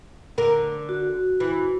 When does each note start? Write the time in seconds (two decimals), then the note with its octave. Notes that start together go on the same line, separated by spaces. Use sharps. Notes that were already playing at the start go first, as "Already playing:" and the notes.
0.38 D3 A#4
0.89 F#4
1.40 E3